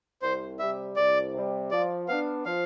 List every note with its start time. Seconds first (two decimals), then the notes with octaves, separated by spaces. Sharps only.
0.22 C2 C5
0.59 C3 G3 E5
0.96 C2 D5
1.34 C3 G3
1.71 F3 D5
2.08 B3 D4 F5
2.45 F3 F5